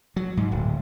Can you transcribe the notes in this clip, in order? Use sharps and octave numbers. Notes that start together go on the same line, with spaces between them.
F#3
G#2
D1